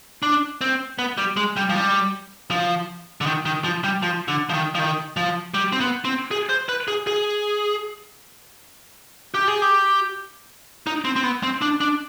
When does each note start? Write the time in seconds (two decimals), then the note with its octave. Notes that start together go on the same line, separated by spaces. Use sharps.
0.23 D4
0.61 C4
0.99 B3
1.18 G3
1.37 G#3
1.57 G3
1.69 F3
1.75 G3
2.51 F3
3.21 D3
3.26 D#3
3.45 D#3
3.64 F3
3.84 G3
4.03 F3
4.28 D3
4.49 F3
4.53 D#3
4.75 F3
4.79 D#3
5.17 F3
5.54 G3
5.72 C4
5.81 B3
6.05 C4
6.31 G#4
6.49 C5
6.69 B4
6.88 G#4
7.07 G#4
9.34 G4
9.48 G#4
9.62 G4
10.87 D#4
11.05 C4
11.16 C4
11.23 B3
11.43 C4
11.62 D4
11.81 D4